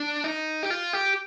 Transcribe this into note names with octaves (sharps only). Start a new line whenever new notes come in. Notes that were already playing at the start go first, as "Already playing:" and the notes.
Already playing: D4
D#4
G4
F4
G4